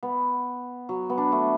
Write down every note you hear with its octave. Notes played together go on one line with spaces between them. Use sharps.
B3
F#3
B3
D4
A3